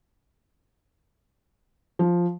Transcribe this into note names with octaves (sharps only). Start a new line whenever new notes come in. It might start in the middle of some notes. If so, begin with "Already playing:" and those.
F3